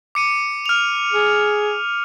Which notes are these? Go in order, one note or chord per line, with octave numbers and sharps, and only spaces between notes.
D6 C#7 D#7
F6 F7
G#4